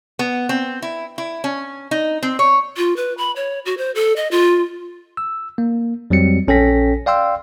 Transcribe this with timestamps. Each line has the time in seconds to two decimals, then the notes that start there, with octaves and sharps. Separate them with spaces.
0.19 B3
0.49 C4
0.82 E4
1.18 E4
1.44 C#4
1.91 D#4
2.23 C4
2.39 C#5
2.77 F4
2.96 B4
3.18 B5
3.36 C#5
3.66 F#4
3.78 C5
3.95 A4
4.16 D#5
4.31 F4
5.17 E6
5.58 A#3
6.10 F2 F#3 G3 C4 C#7
6.48 A#1 C#4 A4 G5 A#6 B6
7.06 D5 F5 G5 C6 E6